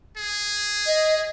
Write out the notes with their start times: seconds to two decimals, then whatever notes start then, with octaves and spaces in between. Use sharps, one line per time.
0.17 G#4
0.86 D#5